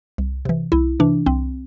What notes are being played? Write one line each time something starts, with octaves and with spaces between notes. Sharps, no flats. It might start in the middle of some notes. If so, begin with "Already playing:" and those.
C2
C3 E3
C2 E4
C3 E3 D4
C2 C4